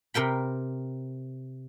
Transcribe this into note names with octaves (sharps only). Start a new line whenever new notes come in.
C3 A#4 G5 B5